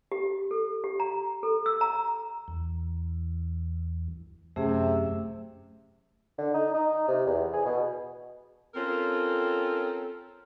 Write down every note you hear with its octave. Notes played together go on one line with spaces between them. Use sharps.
G4
A4
G4
A#5
A4
E6
A#5
E2
F#2 C3 A3 C#4 G#4 E5
D3
D#4
D#4
C3
E2
G#4
B2
C4 C#4 F4 A4 A#4